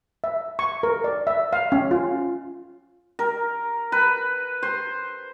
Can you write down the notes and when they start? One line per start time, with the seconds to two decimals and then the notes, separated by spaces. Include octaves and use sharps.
0.24 E5
0.59 C#6
0.83 A#4
1.04 D5
1.27 E5
1.53 F5
1.72 C#4
1.91 F4
3.19 A#4
3.92 B4
4.63 C5